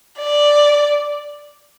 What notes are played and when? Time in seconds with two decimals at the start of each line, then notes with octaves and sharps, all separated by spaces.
0.18 D5